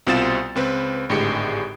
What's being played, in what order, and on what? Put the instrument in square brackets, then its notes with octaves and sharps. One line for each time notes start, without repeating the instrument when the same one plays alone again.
[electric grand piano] C2 B2 C4 F4 A6 E7
C#2 C4 B4
G#1 A2 D3 G#3 G4 C#7